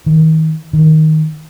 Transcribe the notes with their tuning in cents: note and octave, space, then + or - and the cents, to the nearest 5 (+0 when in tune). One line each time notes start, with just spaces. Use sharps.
D#3 +35
D#3 +10